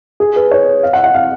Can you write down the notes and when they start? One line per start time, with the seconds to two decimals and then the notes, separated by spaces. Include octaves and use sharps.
0.20 G#4
0.36 B4
0.51 C#5
0.83 F5
0.93 F#5
1.04 F#5
1.14 F5